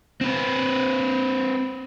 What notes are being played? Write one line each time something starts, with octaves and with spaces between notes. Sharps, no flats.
C4 B4